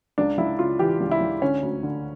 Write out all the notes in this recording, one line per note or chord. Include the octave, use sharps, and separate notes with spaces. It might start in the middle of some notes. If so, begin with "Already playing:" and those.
C#2 D4
C#2 E4
C#3 F4
E3 G4
C#2
E4
C#2
D3 C#4
D2
D3